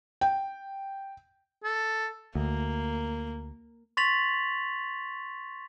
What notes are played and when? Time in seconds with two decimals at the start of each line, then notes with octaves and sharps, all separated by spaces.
0.21 G5
1.64 A4
2.35 D2 A#3
3.97 C6 C#6 A6 B6 F7 F#7